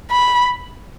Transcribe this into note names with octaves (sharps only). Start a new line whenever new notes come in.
B5